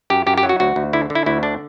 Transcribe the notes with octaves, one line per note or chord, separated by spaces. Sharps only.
F#2 G4
F#2 G4
G4
F#3
F#4
D2 F#4
D2
D3 E4
D3
E4
D2 E4
D3 D4